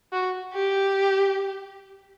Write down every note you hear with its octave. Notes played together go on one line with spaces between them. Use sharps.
F#4
G4